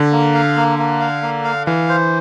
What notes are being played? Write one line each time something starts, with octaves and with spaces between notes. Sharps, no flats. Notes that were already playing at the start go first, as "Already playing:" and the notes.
Already playing: D3
A#3
F5
A#3
A#3
F5
A#3
F5
E3 F5
C5